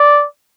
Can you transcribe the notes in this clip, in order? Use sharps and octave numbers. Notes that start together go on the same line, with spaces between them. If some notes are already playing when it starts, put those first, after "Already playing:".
Already playing: D5